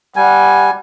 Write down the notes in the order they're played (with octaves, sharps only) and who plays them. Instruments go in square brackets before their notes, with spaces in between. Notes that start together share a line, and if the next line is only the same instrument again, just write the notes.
[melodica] G3 G#5 [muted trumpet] F#5